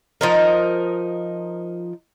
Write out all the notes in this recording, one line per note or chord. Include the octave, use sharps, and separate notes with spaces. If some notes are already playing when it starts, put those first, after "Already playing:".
F3 D#4 A#4